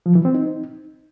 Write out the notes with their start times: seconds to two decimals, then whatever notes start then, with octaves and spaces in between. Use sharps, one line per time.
0.06 F3
0.15 E3
0.25 C4
0.35 D#4